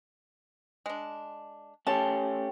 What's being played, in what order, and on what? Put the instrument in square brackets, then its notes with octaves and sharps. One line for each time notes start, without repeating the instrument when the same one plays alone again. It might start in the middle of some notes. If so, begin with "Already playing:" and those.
[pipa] G#3 D4
[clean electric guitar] A3 C#4 G4 [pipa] A5